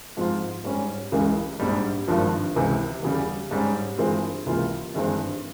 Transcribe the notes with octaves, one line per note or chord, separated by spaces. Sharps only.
G#2 F3 C4 F4
G#2 G3 C#4
C#2 C#3 E3 G#3
A#1 G#2 G3
G#1 G2 F3
C#2 C3 E3
E2 C#3 G3
G#2 G3 C#4
G2 E3 G#3 C4 F4
C#2 C3 E3 A#3 F4
G#1 G2 E3 G#3 C4